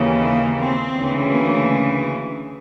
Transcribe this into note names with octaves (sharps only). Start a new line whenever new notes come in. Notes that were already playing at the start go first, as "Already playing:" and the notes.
Already playing: D#2 C#3 E3
A#3
C4
D2 C#3 E3
A#3